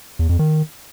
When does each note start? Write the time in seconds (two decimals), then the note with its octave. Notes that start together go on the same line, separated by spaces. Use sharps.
0.19 E2
0.29 F2
0.39 D#3